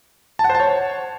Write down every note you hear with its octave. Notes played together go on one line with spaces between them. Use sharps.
A5
F#5
C5
A5
C#5